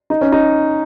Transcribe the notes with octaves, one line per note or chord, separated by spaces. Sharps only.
D#4
C#4
D#4